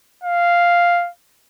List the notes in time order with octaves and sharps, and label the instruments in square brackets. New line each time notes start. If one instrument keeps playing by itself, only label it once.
[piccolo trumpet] F5